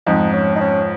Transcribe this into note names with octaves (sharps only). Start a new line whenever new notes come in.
F2 G#2 D#4
C#4
D#4
C#4